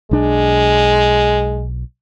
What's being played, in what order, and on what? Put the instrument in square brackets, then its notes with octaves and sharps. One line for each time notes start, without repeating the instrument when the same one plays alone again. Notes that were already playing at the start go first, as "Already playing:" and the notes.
[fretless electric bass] B1 D4 [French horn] G#3